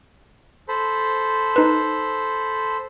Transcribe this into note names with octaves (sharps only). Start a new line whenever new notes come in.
A4 C5 B5
D#4 B4